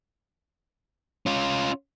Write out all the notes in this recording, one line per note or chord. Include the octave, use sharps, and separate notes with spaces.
C#4 F4